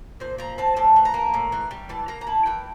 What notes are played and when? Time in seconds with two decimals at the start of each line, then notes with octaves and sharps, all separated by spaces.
0.20 A#2 C5
0.38 F3 A#5
0.58 C4 A5
0.76 A2 A5
0.96 E3
1.05 A#5
1.14 A#3
1.34 A2
1.52 E3
1.71 G3
1.89 E3 A5
2.08 A#3 A#5
2.21 A#5
2.27 E4 A5
2.46 E3 G5